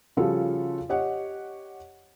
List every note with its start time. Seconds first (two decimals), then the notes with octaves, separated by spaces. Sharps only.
0.17 C#3 F3 G3 F4 F#4 A4
0.89 G4 C#5 D#5 F#5